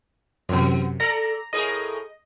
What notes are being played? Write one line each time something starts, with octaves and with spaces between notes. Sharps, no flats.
F#2 C3 E3 B3
A4 D5 A#5 A#6
A2 G#4 A#4 D#5